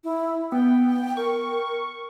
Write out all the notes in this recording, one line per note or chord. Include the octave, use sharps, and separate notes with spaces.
E4
B3 G5
A#4 C#6